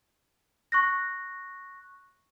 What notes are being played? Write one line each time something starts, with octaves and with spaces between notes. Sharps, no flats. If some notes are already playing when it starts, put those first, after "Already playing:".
C#6 F#6 A#6